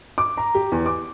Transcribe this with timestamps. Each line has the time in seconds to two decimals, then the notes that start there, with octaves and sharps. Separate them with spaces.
0.18 D6
0.37 A#5
0.55 G4
0.72 E2
0.86 D6